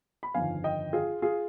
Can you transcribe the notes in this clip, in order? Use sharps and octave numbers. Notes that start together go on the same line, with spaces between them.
B5
G1 F2 D#3 F5 G#5
D#5 G5
F4 G#4
F4 G#4